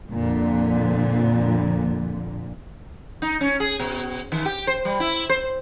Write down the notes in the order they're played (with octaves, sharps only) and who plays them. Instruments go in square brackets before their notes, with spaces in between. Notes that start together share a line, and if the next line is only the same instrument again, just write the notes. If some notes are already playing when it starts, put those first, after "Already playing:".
[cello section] F2 A#2 D3
[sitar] D#4
C#4
G#4
B2
D#3
G4
C5
G3
E4
C5